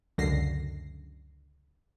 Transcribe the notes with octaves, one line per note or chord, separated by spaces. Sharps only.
C#2 F#2 D3 A#6 C7